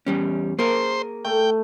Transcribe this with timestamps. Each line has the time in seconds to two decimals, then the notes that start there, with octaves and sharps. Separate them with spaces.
0.07 E2 G3 C#4
0.59 A#3 G#4 A#4 C5
1.25 A3 G5